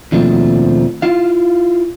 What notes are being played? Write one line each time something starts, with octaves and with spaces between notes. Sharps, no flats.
D#2 B2 F3 A3 C4 D4
E4 F4 F5